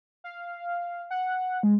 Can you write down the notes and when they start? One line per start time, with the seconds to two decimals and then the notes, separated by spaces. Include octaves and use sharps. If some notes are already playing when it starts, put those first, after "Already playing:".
0.24 F5
1.11 F#5
1.63 G#3